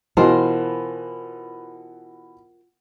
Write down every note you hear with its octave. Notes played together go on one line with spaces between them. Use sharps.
B2 E3 F4 A#4 C5